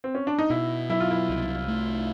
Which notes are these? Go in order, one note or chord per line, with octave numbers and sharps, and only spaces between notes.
C4
C#4
D4
D#4
B2 E4
F#3 E4
F4
E4
C2
A3